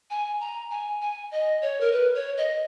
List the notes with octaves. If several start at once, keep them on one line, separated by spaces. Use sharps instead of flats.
G#5
A#5
G#5
G#5
D#5
C#5
A#4
B4
C#5
D#5